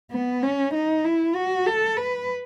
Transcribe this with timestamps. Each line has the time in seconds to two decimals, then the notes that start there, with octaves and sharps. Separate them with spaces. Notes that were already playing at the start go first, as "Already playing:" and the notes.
0.11 B3
0.43 C#4
0.74 D#4
1.04 E4
1.35 F#4
1.66 A4
1.97 B4